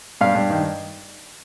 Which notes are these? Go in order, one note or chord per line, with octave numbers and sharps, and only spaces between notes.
G2 F5
G2
D#3